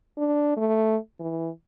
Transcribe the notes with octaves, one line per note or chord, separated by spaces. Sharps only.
D4
A3
E3